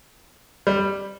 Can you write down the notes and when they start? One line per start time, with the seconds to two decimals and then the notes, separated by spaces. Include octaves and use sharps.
0.67 G3